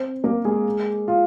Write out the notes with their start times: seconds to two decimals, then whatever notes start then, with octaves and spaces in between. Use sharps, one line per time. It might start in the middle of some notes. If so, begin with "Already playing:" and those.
Already playing: C4 C5
0.24 A#3 A#4
0.45 G#3 G#4
1.08 F4